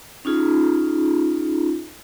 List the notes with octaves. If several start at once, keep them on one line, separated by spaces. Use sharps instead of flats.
C#4 D#4 F4 G#4